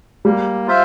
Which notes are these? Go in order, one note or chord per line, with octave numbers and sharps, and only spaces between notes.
G3 A#3
F4 C5 E5